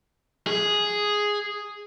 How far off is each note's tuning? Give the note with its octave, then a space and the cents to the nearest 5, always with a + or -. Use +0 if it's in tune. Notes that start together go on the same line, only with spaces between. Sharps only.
G#4 +0